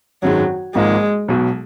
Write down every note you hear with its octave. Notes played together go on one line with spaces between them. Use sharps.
G#1 F#2 D#3 F#3 G#3
G#1 G#2 F3 G#3 A#3
B1 B2 F#3